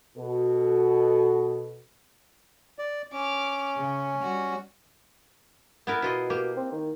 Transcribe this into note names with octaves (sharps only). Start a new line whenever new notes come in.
B2 F#4 A4
D5
C#4 D6 F6
C#3
G3 F#4
B3 E4 A#4
B2 E4 F4 D#5
A#3 G4
C4
D#3